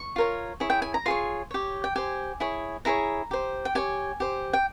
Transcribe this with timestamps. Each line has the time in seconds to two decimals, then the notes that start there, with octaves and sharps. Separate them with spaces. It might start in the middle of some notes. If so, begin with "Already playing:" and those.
Already playing: C#6
0.16 F4 A#4 C#5
0.60 E4 G#4 C#5
0.70 G5
0.82 G#5
0.94 A#5
1.06 F4 G#4 C#5 C6
1.51 G4 C#5
1.84 G5
1.96 G4 C5 G#5
2.40 E4 G#4 C#5
2.85 E4 G#4 C#5 A#5
3.31 G4 C5
3.65 G5
3.75 G4 C#5 G#5
4.20 G4 C5
4.53 G5